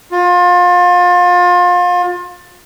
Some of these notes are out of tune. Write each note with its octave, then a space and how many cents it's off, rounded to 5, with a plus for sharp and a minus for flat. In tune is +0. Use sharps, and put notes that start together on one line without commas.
F4 +30